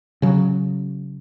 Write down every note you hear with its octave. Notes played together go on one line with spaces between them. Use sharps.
C#3 F#3